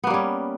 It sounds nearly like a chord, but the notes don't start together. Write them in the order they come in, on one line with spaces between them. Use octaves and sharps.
B3 A#3 G3 C#4